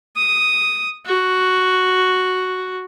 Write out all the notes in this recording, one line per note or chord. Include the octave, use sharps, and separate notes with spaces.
D#6
F#4